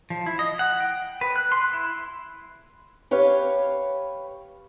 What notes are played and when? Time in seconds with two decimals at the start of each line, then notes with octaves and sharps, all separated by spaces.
0.10 F3
0.26 E4
0.39 D#5
0.59 F#5
0.80 G5
1.21 B4
1.36 F#6
1.52 C6
1.73 E4
3.11 G4 B4 C#5 F5